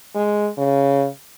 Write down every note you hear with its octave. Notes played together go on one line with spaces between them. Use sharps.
G#3
C#3